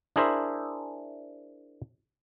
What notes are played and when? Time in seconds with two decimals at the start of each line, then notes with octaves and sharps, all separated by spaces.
0.16 D4 E4 G#4 A#4 C5 E5